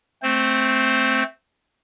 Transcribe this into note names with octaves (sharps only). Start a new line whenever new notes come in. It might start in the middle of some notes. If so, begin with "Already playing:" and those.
A3 C4 C5